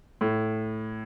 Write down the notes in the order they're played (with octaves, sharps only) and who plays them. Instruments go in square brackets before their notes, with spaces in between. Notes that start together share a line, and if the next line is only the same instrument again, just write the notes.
[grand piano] A2